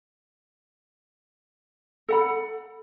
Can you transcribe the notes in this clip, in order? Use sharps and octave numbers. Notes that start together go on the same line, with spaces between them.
A4 F#5 B5